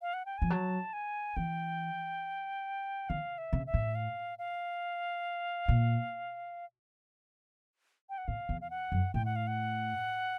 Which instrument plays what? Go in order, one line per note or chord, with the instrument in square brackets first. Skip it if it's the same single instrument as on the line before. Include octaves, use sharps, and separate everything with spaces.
[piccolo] F5
F#5
G5
[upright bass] F3 [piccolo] G#5
[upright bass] F#3 [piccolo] A5
[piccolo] G#5
[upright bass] E3 [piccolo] G5
[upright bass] D#3 [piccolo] F5
[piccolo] E5
[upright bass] C#3
[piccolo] E5
[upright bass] A2
[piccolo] F5
F5
[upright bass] A#2
[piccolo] G5
F#5
[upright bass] A2 [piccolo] F5
[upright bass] E2
[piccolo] F5
F#5
[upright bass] F#2
[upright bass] A2 [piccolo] G5
[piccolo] F#5
F5
F#5